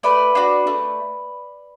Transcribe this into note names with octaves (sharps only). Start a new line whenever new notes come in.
A3 B4 D5
D4 F#4
A3